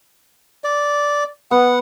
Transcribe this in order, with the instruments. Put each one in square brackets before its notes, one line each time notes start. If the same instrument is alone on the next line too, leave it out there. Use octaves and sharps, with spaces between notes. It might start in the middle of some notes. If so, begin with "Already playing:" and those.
[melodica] D5
[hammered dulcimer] B3 [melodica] F#5